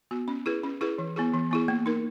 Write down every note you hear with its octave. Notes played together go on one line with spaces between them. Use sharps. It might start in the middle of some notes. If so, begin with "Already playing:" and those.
B3 F#4
C#4
E4 G#4 B4
C#4
E4 G#4 B4
E3
B3 E4 G#4
E3
B3 E4 G#4
A#3
D#4 A#4